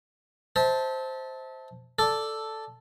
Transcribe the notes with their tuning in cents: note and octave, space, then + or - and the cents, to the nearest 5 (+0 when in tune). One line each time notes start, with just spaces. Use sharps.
C5 +0 E5 -40 A5 +0
A4 +0 D5 +0